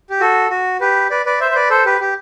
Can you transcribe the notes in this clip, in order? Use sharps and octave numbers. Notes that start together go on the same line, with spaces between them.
G4
F#4 A4
F#4
G4 B4
B4 D5
B4 D5
C5 E5
C5
B4 D5
A4 C5
G4 B4
G4